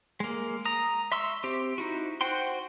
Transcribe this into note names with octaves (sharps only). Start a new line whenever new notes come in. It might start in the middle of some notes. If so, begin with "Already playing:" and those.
G#3 A#3
A#5 D#6
E5 C6 C#6 E6
C4 G4
D#4 E4 F#4
F#4 C5 F#5 G5 C6